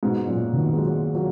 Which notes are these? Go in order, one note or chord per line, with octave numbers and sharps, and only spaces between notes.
G#2 B2
F#2 A#2
B2 D#3
G#3
F#3 A#3
F#3 A#3